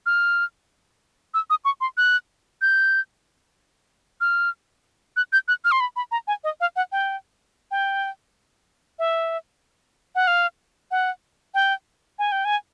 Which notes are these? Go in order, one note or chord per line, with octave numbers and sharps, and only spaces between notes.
F6
E6
D#6
C#6
C6
F#6
G6
F6
F#6
G6
F#6
F6
C6
B5
B5
A#5
G#5
D#5
F5
F#5
G5
G5
E5
F#5
F5
F#5
G5
G#5
G5
G#5